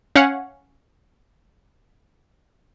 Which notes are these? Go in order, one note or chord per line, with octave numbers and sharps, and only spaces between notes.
C#4 C#5 F5 F#5